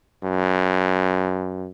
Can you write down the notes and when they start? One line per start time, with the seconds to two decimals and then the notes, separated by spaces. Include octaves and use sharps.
0.24 F#2